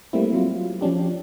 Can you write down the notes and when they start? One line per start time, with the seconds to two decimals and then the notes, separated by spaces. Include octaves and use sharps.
0.13 G3 A3 A#3 C4 E4
0.33 F#3 F4
0.81 F3 C#4 D4 G4